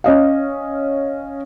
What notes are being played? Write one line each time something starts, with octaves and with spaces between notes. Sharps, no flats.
C#4 D#5 F5